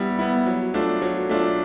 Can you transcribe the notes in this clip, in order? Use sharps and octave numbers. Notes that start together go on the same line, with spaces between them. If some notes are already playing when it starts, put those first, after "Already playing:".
Already playing: G3 B3 E4
B3 E4
F#3
A3 D4 F4
F#3
A3 D4 F4